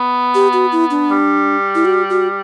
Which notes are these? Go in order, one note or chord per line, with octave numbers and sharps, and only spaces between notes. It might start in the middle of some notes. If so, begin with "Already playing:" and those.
Already playing: B3
G4
F#4
E4
D4
G3
E4
F#4
F#4